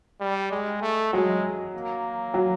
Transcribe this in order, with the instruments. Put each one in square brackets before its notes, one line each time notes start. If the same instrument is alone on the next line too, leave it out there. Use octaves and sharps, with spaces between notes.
[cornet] G3
G#3
A3
[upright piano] F#3 [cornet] G#3
[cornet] A#3
[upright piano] F#3